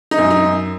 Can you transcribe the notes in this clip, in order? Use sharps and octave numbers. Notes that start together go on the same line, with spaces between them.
D#4
F#2
D#4
F#2